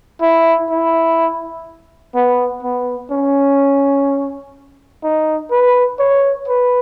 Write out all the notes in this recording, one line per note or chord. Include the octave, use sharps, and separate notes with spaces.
E4
E4
B3
B3
C#4
D#4
B4
C#5
B4